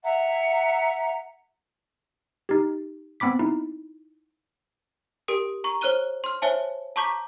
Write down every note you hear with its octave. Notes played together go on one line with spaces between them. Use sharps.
E5 F#5 A#5
D#4 G4
B3 C4 B5 D6 B6
D#4 E4
G4 A#4 D#6 D7
A#5 C#6
C5 C#5 F6 F#6 D#7 G7
C6 F6
C5 C#5 E5 G#5 A5
A5 A#5 C#6 D6 G6 B6